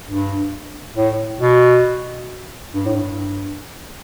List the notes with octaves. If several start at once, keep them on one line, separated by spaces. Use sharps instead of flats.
G2
A2
B2
G2
A2
G2